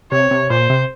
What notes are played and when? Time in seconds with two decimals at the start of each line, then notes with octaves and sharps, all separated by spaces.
0.11 C3 C#5
0.31 C3
0.50 A#2 C5
0.70 C3